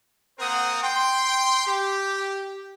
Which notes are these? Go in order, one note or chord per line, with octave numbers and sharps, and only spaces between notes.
A#3 C4 A#4 C5 F#5 D#6
G5 C6
G4